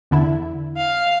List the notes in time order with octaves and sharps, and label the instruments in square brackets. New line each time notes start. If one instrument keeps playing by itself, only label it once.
[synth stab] E2 D3 E4
[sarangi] F5